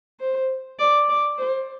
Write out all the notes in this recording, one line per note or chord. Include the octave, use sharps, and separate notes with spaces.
C5
D5
D5
C5